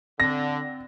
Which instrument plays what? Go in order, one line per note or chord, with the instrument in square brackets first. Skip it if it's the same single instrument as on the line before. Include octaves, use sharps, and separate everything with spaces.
[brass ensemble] D3 [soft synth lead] C4 [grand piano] A#6